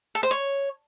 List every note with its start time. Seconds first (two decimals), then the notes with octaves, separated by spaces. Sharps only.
0.15 A4
0.23 C5
0.31 C#5